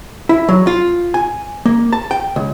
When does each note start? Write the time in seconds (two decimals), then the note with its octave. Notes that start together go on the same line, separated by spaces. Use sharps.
0.29 E4
0.49 F#3
0.67 F4
1.14 G#5
1.66 A#3
1.93 A5
2.11 G5
2.36 C#2